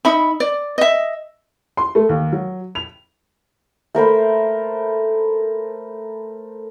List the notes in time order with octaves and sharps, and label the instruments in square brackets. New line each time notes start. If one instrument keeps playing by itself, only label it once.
[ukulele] D#4 E5 B5
D5
D#5 E5
[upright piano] C6
A3
D#2
F#3
F7
[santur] A3 A#4 C5 B5